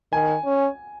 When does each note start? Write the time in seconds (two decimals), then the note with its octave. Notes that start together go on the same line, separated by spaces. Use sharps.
0.12 D#3 G#5
0.45 C#4